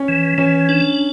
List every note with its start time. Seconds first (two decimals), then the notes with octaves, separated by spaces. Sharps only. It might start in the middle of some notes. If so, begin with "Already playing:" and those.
Already playing: C#4
0.08 E3
0.38 E3 C#4
0.69 D4